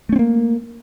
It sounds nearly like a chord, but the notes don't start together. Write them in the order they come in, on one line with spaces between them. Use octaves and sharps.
A3 C#4 C4 A#3